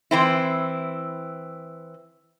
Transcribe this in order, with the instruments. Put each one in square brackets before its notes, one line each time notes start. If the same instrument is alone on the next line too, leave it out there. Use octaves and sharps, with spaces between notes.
[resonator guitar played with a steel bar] E3 C4 E4